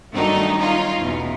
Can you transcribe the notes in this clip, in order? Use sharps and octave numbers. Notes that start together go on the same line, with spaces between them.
G2 D#3 F#3 A3 D4 D#4
C#4 D#4 F4
E2 B2